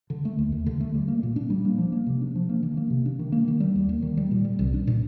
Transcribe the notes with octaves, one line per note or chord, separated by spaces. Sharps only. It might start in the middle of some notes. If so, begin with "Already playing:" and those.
D3
A3
D#2
D#2
D3
A3
G3
A#3
A#2
D4
G3
A#3
F3
A#3
C3
D4
F3
A#3
D#3
A#3
C3
D4
D#3
A#3
D#3
G3
D#2
A#3
D#3
G3
A#2
G3
C2
D4
A#2